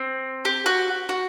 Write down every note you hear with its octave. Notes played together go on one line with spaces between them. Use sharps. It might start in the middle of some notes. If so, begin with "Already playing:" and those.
Already playing: C4
G4
F#4
F#4